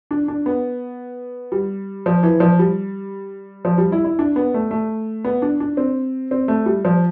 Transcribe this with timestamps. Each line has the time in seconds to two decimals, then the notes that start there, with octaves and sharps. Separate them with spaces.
0.11 D4
0.28 D4
0.46 B3
1.52 G3
2.06 F3
2.23 E3
2.40 F3
2.59 G3
3.65 F3
3.78 G3
3.92 E4
4.05 E4
4.19 D4
4.36 B3
4.54 A3
4.71 A3
5.24 B3
5.42 D4
5.60 D4
5.77 C4
6.31 C4
6.48 A3
6.66 G3
6.85 F3